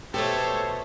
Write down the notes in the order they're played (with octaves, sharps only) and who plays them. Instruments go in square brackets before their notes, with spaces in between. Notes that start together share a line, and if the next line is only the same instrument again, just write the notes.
[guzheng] B2 A3 [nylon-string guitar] G4 [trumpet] A4 [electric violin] C5 C#5